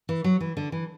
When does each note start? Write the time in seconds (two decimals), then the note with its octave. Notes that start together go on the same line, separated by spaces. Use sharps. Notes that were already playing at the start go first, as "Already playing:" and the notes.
0.09 E3
0.24 F#3
0.41 E3
0.57 D3
0.72 E3